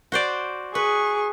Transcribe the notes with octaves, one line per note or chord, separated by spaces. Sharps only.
F#4 C5 D5
G#4 B4 C#6